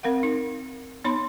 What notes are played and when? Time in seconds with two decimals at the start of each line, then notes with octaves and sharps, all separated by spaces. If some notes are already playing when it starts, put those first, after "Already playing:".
0.03 C4 A#4 F5 F#5
0.23 D#4
1.04 B3 D#4 C#5 B5 C6